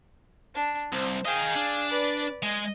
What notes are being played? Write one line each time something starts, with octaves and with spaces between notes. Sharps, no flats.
D4
C2 C5
G#4 D#5 F5 G5
D4
B4 D5
G#3 D#5